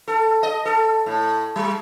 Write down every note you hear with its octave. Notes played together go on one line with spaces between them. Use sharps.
A4
D#5
A4
A2
G3